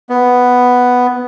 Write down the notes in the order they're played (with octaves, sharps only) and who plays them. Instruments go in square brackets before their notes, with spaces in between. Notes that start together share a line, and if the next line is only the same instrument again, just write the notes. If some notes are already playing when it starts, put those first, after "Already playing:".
[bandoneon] B3